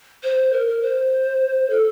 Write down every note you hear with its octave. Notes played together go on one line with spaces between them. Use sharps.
C5
A#4
A#4
C5
A4